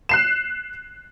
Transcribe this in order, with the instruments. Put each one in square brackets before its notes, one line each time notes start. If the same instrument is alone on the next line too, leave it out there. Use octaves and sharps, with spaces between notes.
[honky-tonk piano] F#6 C7 E7